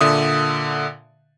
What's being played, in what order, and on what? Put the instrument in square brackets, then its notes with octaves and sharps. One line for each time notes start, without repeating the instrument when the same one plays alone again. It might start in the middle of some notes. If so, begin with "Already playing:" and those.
[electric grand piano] A#2 D3 E5 D#6